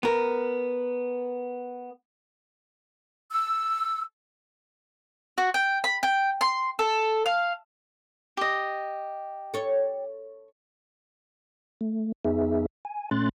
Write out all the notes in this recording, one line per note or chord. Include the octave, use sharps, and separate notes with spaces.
B3 A#4
E6
F#4
G5
B5
G5
C6
A4
F5
G4 D#5
A4 C#5
A3
F2 B3 D#4 G#4 E5
G#5
A#2 A3 C#4 C6 F#6 A6